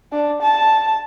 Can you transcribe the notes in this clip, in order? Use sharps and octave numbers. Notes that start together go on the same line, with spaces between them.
D4
A5